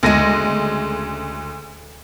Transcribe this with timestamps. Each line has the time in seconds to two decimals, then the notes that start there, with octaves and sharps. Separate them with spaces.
0.03 D2 C#3 G#3 A#6 D#7